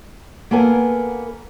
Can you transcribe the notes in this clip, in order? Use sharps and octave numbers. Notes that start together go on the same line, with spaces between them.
A#3 B3 A4 A#4 G#5